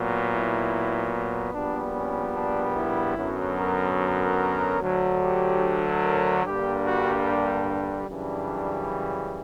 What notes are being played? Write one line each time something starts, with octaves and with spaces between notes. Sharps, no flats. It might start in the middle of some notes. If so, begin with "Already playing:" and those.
Already playing: A#2 F#3 B3
E4
A#1 A#2 G3 B3 D4
C#4
D4
E4
F#2 D3 F#3 B3
A#4
A#4
D2 D3 F#3
G4
A#4
G2 D3 G3 A#3 G4
F#4
D4
F#2 C#3 E3 G3 D4